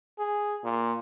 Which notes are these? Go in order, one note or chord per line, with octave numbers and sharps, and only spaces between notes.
G#4
A#2